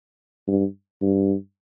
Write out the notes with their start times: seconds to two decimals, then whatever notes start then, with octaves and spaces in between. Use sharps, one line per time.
0.48 G2
1.02 G2